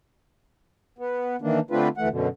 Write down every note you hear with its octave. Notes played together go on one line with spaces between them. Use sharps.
B3
D#3 E3 A#3 D4
D3 A3 C4 D4 F4 B4
D2 E3 A3 F#5
F#2 B2 D3